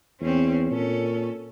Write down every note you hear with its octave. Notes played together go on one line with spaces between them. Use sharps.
E2 C4 C#4
A#2 C#4 A4